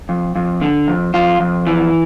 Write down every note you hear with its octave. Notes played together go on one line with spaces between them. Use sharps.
F2
F2
D3
F2
F2 F4
F2
E3